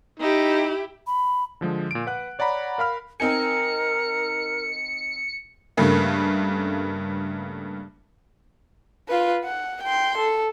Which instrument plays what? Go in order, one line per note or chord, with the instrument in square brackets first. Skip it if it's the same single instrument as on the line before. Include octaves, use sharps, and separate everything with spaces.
[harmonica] D#4 [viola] E4 G4
[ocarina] B5
[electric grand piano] D3 F3 G#3
A#2 D7
B4 F#5 F#6
C#5 D5 F#5 A#5 B5
A#4 F5 B5 F6
[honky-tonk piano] C4 D#4 G#5 [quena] A#4 [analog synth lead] C#7
[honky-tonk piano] G2 C#3 A3 A#3
[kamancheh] F4 B4
F#5
G5 C6
A4